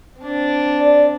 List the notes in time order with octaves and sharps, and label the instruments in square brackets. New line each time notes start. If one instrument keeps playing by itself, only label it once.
[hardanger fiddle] C4 D4
[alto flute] D5